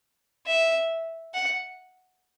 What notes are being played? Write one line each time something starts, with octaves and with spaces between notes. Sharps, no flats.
E5
F#5